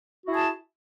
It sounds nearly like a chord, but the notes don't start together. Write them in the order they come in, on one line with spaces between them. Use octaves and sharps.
F#4 E4 G#4 A5